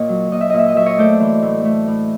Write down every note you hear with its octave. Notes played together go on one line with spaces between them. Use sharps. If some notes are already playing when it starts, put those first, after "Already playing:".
Already playing: A#2 C#5 D#5
F#3
A#2 D#5
E5
A#2 D#5
E5
D#5
F#3 E5
C#5 D#5
A3 C5 D5
E3
A2
A3
A2